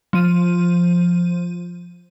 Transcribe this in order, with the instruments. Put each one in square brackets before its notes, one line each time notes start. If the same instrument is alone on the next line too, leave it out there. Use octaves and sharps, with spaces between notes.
[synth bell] F3 D#7